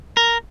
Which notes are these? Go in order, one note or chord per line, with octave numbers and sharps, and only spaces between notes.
A#4